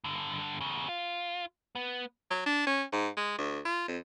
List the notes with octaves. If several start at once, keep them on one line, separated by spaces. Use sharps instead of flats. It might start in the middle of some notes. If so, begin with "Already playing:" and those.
G2 D3
E2 C#3
F4
B3
F#3
D4
C#4
G#2
G#3
D2
F4
F2